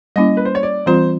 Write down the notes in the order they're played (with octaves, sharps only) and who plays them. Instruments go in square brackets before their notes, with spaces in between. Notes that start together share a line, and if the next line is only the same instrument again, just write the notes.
[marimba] G3 A#3 C#4 E4 [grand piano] D#5
[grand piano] B4
C5
C#5
D5
[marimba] E3 G3 C4 F4 [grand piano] C5